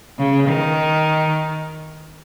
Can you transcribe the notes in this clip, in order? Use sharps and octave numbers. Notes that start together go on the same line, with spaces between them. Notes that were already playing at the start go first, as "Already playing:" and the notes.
C#3
D#3